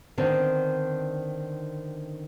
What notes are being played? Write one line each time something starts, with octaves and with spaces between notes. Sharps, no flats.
D3 D#3 B3 C4 D4